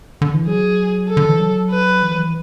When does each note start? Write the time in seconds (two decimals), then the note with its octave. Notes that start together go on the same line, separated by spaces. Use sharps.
0.22 D3
0.34 E3
0.47 F#3 G#4
1.09 A4
1.17 D3
1.29 E3
1.40 F#3
1.71 B4
2.02 E3
2.14 F#3
2.18 E3